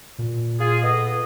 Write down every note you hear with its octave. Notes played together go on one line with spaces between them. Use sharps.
A#2
F4 G#4
B3 A4 D#5